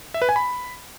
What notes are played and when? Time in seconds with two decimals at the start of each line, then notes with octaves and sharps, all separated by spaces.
0.14 E5
0.22 B4
0.29 G#5
0.36 B5